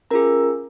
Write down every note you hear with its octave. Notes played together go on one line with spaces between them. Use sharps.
C#4 F4 G#4 A#4 A#5